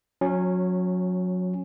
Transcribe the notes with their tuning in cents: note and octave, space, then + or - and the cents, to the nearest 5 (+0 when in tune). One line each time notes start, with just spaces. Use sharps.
F#3 -25 C#4 +0